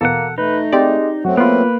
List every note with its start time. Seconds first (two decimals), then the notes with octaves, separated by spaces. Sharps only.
0.01 E2 B2 A#3 A4 F#5
0.38 A3 D#4 B4
0.73 G#3 C4 G4 D5
1.25 F#2 F#3 A3 C4 F#4
1.37 A#3 B3 F4 B4